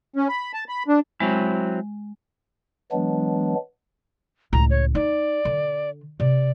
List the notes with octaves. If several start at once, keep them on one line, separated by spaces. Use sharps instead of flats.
C#4
B5
A5
B5
D4
F#3 G#3 C4 E4
E3 F#3 G#3 B3 D4
C#2 A2 A#5
C#5
D#4 D5
D3
C3 D5